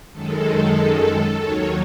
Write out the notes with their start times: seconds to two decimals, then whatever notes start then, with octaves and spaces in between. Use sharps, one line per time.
0.12 F#2 D#3 G#3 A4
1.40 D#2 D#3 F#3 C#5